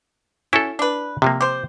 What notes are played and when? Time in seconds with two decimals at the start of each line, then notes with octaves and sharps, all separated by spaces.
0.53 C#4 E4 F#4 A4
0.79 D4 B4
1.22 C3 F3 A#3
1.41 G4 C5